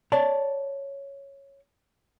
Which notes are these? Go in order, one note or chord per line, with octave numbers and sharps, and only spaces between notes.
C#5 D5 A5